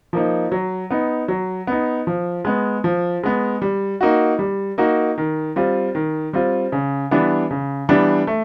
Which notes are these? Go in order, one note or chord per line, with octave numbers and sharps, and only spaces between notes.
F3 A#3 D#4
F#3
B3 D#4
F#3
B3 D#4
F3
G#3 B3
F3
G#3 B3
G3
A#3 D#4 F#4
G3
A#3 D#4 F#4
D#3
G3 C4 F4
D#3
G3 C4 F4
C#3
E3 G3 B3 D4
C#3
E3 G3 B3 D4
A3